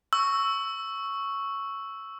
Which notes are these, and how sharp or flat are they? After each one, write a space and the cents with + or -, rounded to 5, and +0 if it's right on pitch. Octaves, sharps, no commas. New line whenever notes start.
C#6 +0 E6 +0